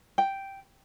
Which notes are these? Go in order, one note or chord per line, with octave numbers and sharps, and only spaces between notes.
G5